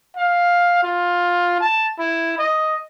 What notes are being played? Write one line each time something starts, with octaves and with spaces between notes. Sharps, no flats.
F5
F4
A5
E4
D#5